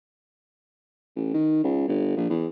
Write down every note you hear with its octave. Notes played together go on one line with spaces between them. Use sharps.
A1
D#3
C#2
G1
A#1
E2